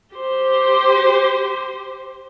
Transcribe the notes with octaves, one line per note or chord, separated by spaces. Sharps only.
G4 C5